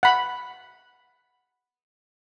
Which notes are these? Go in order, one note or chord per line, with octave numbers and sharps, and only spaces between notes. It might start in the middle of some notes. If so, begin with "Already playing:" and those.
F#5 B5